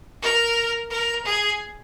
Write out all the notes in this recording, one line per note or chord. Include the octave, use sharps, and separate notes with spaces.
A#4
A#4
G#4